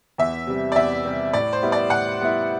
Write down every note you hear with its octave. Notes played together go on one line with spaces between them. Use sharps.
E2 E5
C3 G3
D5
E2 E5
C3 G3
A2 D5
C5
G3 B3 E4
D5
A2 F#5
G3 B3 E4